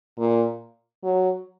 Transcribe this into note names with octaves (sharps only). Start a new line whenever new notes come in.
A#2
F#3